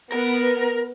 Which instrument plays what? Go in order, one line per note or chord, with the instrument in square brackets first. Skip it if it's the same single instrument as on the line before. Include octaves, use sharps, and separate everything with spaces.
[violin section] B3 [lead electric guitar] A#4